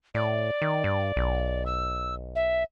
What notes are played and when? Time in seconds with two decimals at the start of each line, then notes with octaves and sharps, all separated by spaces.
0.15 A2 D5
0.62 D#3
0.84 G2
1.16 B1
1.66 E6
2.35 E5